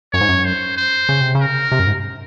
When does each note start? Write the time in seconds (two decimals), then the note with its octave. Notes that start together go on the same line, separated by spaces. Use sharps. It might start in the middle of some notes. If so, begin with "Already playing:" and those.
0.13 F#2 C#5
0.21 G#2
0.29 F#2
0.45 C5
0.77 C5
1.09 C#3
1.21 C3
1.35 C#3
1.40 A#4
1.72 C3
1.79 F#2
1.87 G#2